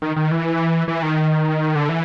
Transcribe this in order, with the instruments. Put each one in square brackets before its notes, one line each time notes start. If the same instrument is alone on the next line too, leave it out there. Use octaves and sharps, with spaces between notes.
[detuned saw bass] D#3
D#3
E3
E3
D#3
D3
E3